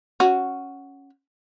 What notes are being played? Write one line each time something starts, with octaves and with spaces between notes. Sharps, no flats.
C#4 F#4